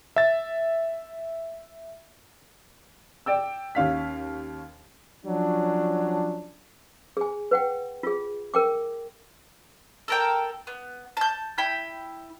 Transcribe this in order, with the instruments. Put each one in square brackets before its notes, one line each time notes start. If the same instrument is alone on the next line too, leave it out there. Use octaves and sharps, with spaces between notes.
[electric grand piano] E5 A6
[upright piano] D5 G5 E6
D#2 C#4 F5 B6
[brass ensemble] F3 F#3 C#4 D4
[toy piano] G#4 G#5
B4 F#5 G5
F4 G#4
A#4 G5 D6
[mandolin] A4 A#4 G5
B3
A5 G6
E4 G5 B5 G6